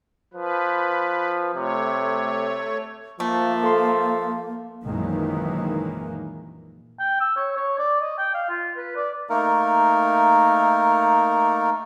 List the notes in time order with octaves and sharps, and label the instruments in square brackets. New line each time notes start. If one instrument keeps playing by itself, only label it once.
[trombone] F3 [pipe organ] B4
[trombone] C3 [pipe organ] A3 C#5
[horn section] F3 [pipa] A3 [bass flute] A#3
[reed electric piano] A4 C6
[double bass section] A#1 F#2 D#3 E3 G#3 A#3
[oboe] G5
E6
C#5
C#5
D5
D#5
G5
F5
F4
B4
D5
[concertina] A3 A#3 D#4 A#4